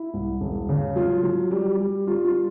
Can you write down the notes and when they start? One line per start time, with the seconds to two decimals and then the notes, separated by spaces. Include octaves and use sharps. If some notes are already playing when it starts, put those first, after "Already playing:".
Already playing: E4
0.14 C2
0.40 E1
0.69 C#3
0.96 F#3 F4
1.23 F#3
1.51 G3
1.78 G3
2.07 G3 F4
2.25 F4
2.35 G3